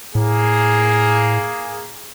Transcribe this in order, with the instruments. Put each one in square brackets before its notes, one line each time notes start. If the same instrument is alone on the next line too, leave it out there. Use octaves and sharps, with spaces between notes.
[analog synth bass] A2 [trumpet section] A#3 G#4